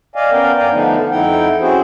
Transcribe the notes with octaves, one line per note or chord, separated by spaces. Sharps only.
D5 D#5 F5 G#5
B3 C#4 A#4 D5 F5 G5
G2 D5 F5 G5 G#5 A#5
D3 F3 A3 B3 D4 D#4
F2 D#4 E4 F#5 G5
C4 C#4 E4 F#4 G#4 C5